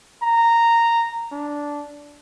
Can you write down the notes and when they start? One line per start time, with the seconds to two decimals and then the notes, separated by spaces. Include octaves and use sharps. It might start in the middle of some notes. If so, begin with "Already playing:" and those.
0.23 A#5
1.32 D4